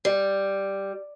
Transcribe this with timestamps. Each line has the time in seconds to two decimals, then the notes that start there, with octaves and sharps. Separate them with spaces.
0.05 G3